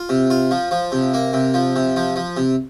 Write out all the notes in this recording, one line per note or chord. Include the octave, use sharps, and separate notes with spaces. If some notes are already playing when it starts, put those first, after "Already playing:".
Already playing: F4
C3
F4
F3
F3
C3
A#3
C3
F3
C3
F3
F3
C3